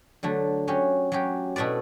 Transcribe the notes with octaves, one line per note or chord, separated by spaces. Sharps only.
D3 F#3 A3
F#3 C#4 G4
F#3 C#4 G4
B2 A3 E4 B4 D5